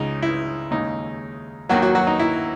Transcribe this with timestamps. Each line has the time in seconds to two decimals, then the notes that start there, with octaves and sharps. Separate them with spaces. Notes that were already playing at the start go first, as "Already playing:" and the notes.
Already playing: C#2 C#3 G#3 D#4
0.22 E4
0.71 D#2 C#3 G#3 D#4
1.69 D#2 D#3 F#3 A#3 F#4
1.82 F#3 F#4
1.95 F#3 F#4
2.07 D#4
2.19 E4